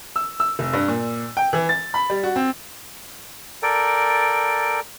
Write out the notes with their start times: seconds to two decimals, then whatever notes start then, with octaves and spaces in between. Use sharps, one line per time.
0.16 E6
0.40 E6
0.59 F1
0.73 G2
0.88 A#2
1.37 G5
1.53 E3
1.69 A6
1.94 B5
2.10 G3
2.23 F#4
2.36 C4
3.63 A4 A#4 D5 G5